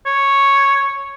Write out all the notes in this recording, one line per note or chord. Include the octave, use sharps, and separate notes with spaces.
C#5